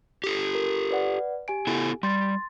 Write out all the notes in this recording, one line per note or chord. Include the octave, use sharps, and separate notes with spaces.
G4 A4
A#4
B4 D5 F#5
G4 G#5 D7
B3 E4 A4
G3 C6 A6